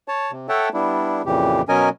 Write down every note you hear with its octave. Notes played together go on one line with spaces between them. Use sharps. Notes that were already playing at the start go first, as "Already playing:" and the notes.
C#5 A5
C3
A4 C#5 E5 F#5 G5 A5
G3 B3 D4 E4
F2 A#2 C#3 E3 G4
B2 F#3 C#4 A#4 D#5 G#5